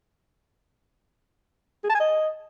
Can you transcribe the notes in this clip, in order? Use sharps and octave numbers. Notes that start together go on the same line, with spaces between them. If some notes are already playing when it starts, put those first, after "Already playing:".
G#4
A5
G#5
D#5